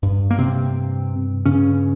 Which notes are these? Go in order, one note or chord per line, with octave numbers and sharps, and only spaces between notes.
G2
A#3
C3 C4
G2 C#3 C#4